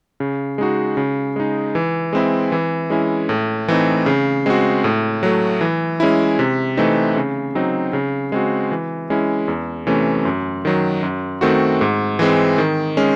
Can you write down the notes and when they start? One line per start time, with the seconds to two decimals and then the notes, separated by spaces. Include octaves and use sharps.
0.20 C#3
0.58 G#3 D#4 F#4
0.97 C#3
1.36 G#3 D#4
1.75 E3
2.13 G#3 C4 E4
2.52 E3
2.90 G#3 C#4 E4
3.29 A2
3.68 E3 A3 C4 D#4
4.06 C#3
4.46 G#3 C4 F#4
4.84 A2
5.23 F#3 A3
5.61 E3
6.00 G#3 C#4 E4
6.39 C3
6.77 E3 A3 C4 D#4
7.16 C#3
7.55 F#3 C4 D#4
7.93 C#3
8.32 G#3 C4 F#4
8.71 E3
9.10 G#3 C#4 E4
9.48 E2
9.87 C3 E3 A3 C#4
10.25 F#2
10.65 D#3 F#3
11.03 F#2
11.41 D#3 A3 C4 F#4
11.81 G#2
12.19 E3 G#3 C4
12.58 D#3
12.97 G#3 C#4